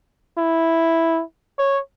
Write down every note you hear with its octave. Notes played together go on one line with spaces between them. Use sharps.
E4
C#5